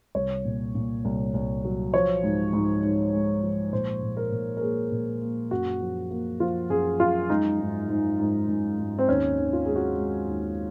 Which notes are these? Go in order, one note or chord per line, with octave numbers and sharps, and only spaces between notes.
C2 C#5
A#2
A#2
C2
C2
F#3
F3 C#5
G#2
G#2
G#2
G#3
F3
A#2 C5
A#2
A#4
A#2
A#4
A#3 G#4
A#2
A#3
F#2 F#4
F3
A#3
F3 F4
F#2 G#4
F#2 F4
G#3 D#4
G#2
G#2
G#2
G#2
G#2
C4
D#2 C#4
D#3
F4
G#3 G#4
F#4
G#3
D#2